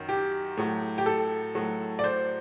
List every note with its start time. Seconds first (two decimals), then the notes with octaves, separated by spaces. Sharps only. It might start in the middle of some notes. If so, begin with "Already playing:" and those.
Already playing: F#2 D#3 F#3
0.09 G4
0.57 A2 F#3
0.98 G4
1.06 A4
1.55 A2 F#3
1.99 D5
2.04 C5